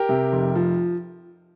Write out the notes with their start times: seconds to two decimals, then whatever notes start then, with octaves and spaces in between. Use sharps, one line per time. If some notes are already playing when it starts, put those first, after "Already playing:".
Already playing: G4 A#4
0.09 C3
0.32 F1
0.55 F3